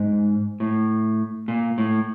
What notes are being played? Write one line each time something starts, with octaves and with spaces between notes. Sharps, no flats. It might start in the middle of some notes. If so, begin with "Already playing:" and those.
Already playing: G#2
A2
A#2
A2